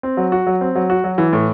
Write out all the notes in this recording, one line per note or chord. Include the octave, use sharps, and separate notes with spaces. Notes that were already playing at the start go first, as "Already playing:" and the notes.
C4
F#3
F#4
F#3
C4
F#3
F#4
F#3
E3
A2